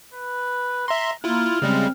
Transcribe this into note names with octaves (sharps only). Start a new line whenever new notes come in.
B4
E5 A#5 C6
A#3 E4 F4 F6
C#3 G3 G#3 C4